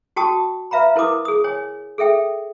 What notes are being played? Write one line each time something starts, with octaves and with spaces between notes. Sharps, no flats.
F#4 G5 A5 C#6 D#6
B4 E5 F5 A#5 B5
E4 A#4 B4 D6 D#6
G#4 D#6
C#5 G#5
G#4 A4 E5 G5